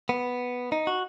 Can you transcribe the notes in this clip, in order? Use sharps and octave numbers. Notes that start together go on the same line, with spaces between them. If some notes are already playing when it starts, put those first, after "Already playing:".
B3
D#4
F#4